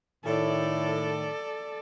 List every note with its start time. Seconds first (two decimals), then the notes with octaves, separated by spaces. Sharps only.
0.25 A2 D#3 A4 D5